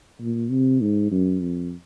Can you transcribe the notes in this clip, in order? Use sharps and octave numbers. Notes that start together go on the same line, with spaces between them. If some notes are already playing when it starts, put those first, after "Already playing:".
A#2
C3
G#2
F#2
F2